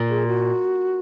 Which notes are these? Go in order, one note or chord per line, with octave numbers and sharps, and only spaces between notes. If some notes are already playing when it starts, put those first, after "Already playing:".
Already playing: A#2
G#4
F#4